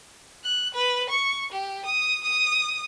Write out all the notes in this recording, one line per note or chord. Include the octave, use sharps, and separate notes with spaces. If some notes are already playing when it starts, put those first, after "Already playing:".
F#6
B4
C#6
G4
D#6
D#6